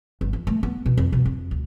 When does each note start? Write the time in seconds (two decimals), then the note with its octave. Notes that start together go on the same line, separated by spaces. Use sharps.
0.21 G1
0.33 F2
0.47 A3
0.63 B3
0.86 B2
0.97 F2
1.13 B2
1.25 F2
1.51 D2